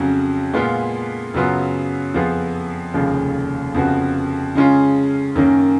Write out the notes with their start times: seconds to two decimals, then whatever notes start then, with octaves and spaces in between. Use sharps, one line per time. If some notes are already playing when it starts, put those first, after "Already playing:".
Already playing: F2 C#3 F#3 C#4
0.53 A#2 G#3 B3 F4
1.34 F#2 C#3 F#3 B3 F4
2.14 F2 F3 B3 F4 G#4
2.94 F1 D#2 C#3 F3 G#3
3.74 F2 C#3 F3 B3 F#4
4.55 C#3 G#3 C#4 F4
5.36 F#2 D#3 A#3 C#4